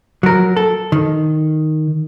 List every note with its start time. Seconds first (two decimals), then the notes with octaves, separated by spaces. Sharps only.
0.23 F#3 A#4
0.57 A4
0.92 D#3